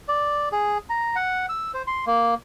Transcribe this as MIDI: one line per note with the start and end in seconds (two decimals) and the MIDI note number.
0.08 0.49 74
0.52 0.78 68
0.90 1.15 82
1.15 1.46 78
1.49 1.71 88
1.74 1.82 72
1.87 2.05 84
2.06 2.35 58